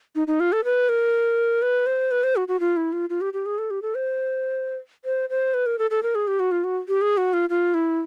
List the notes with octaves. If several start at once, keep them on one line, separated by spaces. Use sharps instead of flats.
D#4
D#4
F4
A4
B4
A#4
B4
C5
B4
C5
F#4
F#4
F4
E4
F4
F4
G4
G4
G#4
A4
G4
A4
C5
C5
C5
B4
A#4
A4
A4
A#4
G#4
G4
F#4
F4
F#4
G4
G#4
F#4
F4
F4
E4